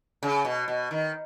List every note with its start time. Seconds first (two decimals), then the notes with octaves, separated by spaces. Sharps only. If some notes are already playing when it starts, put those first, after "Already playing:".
0.23 C#3
0.45 B2
0.68 B2
0.91 D#3